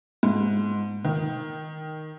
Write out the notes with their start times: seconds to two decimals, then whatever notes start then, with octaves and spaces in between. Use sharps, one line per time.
0.23 G#2
1.05 D#3